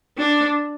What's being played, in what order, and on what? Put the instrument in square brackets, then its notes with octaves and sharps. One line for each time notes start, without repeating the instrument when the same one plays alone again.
[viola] D4